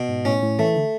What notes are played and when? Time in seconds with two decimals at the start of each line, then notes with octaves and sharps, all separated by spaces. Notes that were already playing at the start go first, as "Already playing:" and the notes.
Already playing: B2
0.09 G#2
0.25 A2 C#4
0.42 A2
0.59 E3 A3
0.76 D3